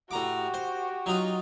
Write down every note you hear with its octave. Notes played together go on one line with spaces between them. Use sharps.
A2 F#4 G4 A#5 D6
C5
F#3 D#4 F4